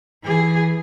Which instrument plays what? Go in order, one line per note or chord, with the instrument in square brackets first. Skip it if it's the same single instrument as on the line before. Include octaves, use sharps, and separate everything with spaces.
[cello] E3 G#4